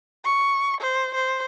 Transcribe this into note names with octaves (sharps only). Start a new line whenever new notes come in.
C#6
C5
C5